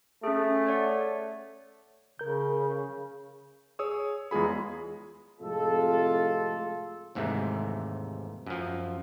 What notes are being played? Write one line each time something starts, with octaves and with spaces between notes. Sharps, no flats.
A3 C#4 G#4
C#5 D5 F#5
C#3 A#4 G6
G#4 C#5 D#6 E6
E2 G#3 F4 G#4 B5
F2 A2 C3 G#3 F4 A4
D#2 G#2 C3 E3 A3
F#2 F3